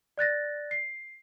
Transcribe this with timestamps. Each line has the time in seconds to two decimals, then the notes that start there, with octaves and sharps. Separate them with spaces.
0.18 D5 F#6 A6 A#6
0.71 C7